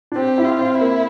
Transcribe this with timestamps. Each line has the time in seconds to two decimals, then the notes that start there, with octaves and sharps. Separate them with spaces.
0.12 D4
0.16 C4 G4
0.38 E4
0.45 F4
0.59 C4
0.74 E4
0.81 A#3